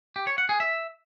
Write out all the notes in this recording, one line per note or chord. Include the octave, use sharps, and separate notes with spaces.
G4
C#5
F#5
G#4
E5